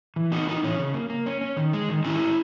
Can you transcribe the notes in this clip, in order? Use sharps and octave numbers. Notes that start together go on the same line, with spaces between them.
E3
A#3 D#4 F#4
E3 D#4
E3 C#4
C#3
A#3
A#3
C#4
C#4
D#3
G#3
D#3
G#3 C#4 E4
C#4